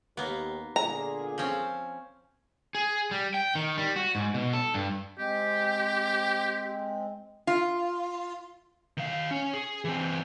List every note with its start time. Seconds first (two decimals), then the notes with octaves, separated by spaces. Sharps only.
0.17 D#2 A#3 B3
0.76 A#2 D3 G#4 A#5
1.38 F3 C4 C#4
2.75 G#4
3.11 G3
3.34 G5
3.55 D#3
3.78 G3
3.96 F#4
4.15 G#2
4.34 B2
4.53 A4
4.74 G2
5.19 G#3 C4 G4
7.47 F4
8.97 D#3 F5
9.31 C#4
9.54 G#4
9.85 E3 C4